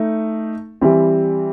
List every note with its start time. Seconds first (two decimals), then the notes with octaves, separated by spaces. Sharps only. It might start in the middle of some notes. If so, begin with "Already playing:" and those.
Already playing: A3 D#4
0.81 E3 G3 C4